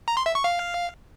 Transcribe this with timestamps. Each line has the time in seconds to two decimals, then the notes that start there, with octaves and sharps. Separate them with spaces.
0.08 A#5
0.17 C6
0.26 E5
0.35 C#6
0.44 F5